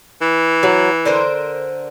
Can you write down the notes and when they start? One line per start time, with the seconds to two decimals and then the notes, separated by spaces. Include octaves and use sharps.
0.21 E3
0.63 F#3 F#5
1.05 D3 A#4 C5